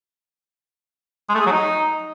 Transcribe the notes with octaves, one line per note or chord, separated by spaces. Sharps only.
G#3
A3
G#4
F#3
D#4